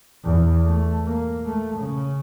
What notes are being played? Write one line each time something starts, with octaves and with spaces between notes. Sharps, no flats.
E2
A3
A#3
A3
C#3